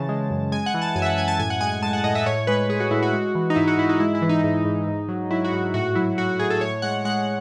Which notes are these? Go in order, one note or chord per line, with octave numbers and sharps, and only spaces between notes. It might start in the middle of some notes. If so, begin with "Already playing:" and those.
Already playing: C#3 E3 A5
G#3
F#2
G#3 G#5
F#5
E3
A5
F#2 G#5
E5
F#5
F#2 G#5
A5
A2 G#5
F#5
G#3 G#5
G#3 A5
F#5
A2 D#5
E5
A2 C#5
G#3 B4
G#3 G#4
F#4
A2 E4
F#4
G#3
E3
D#4
G#2 E4
F#4
G#2 E4
D#4
G#3 E4
E4
E3
D#4
G#2
G#2
G#2
F#3
F#3 E4
F#4
G#2
A2 F#4
F#3 E4
F#3 F#4
F#4
A2 G#4
A4
A2 C#5
G#3 F#5
G#3 F#5